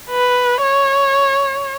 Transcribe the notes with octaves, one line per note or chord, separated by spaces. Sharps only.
B4
C#5